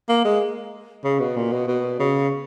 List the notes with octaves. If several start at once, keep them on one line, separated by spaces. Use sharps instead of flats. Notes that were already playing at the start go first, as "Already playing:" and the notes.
A#3
G#3
C#3
B2
A#2
B2
B2
C#3